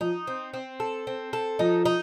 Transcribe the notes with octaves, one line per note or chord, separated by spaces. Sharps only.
F3 D#4
C4
C4
A4
C4
A4
F3 D#4
D#4